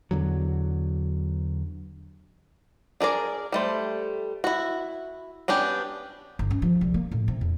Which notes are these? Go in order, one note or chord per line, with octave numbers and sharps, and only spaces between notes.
E2 D3 F#3
D4 G#4 A#4 D5
G3 A3 C5
E4 F#4
B3 C#4 D4 G4
G1
C#4
F3
C2
A#3
A2
C3
E2